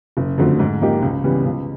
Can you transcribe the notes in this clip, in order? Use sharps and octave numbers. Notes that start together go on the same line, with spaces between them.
F#1
F2 D3 F#3 A3
G#2
F3 A#3 D#4 G4
C#2
C#3 E3 G3 B3
C#2